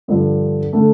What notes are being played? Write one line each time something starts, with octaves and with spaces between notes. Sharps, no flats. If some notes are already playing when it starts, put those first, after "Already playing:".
G2 D3 F3
D3 A3 D4